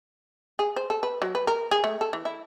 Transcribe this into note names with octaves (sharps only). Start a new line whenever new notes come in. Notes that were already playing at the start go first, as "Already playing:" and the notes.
G#4
C5
A4
B4
F#3
B4
A#4
G#4
A3
A4
E3
E4